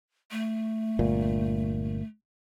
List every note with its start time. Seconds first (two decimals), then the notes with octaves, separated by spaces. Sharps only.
0.31 A3
0.99 G1 A#2